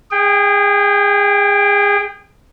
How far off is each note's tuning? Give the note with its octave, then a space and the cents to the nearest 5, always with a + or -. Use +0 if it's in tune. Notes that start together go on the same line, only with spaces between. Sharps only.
G#4 -25 G5 +10